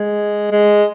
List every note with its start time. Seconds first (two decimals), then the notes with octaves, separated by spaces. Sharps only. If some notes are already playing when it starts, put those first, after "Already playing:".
Already playing: G#3
0.51 G#3